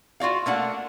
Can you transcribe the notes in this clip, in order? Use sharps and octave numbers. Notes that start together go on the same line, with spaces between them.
F4 F#4 D5 F5
A3 A#3 D4 F#5